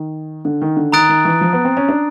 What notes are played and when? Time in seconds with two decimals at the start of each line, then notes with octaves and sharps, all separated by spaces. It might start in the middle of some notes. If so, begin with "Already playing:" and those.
Already playing: D#3
0.45 D3
0.62 D#3
0.77 D3
0.92 D#3 A#5 D#6 F#6 A6 D7
1.09 D#3
1.25 E3
1.41 F3
1.53 B3
1.65 C4
1.77 C#4
1.89 D4